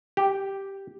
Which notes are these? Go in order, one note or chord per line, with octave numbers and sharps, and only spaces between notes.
G4